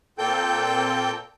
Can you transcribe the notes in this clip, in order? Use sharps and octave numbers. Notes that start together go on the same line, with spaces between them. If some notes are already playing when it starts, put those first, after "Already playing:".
A#2 A#3 C4 A4 G5 G6